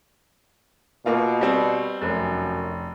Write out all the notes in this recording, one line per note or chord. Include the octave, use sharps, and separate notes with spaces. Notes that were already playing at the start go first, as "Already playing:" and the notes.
B2 A#3 F4
G3 C4
F1 F#2